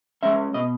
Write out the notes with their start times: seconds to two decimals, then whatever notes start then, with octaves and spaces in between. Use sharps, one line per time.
0.23 G#3 C#4 E5
0.54 B2 D#5